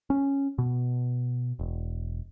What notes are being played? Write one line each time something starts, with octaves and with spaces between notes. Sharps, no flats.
C#4
B2
E1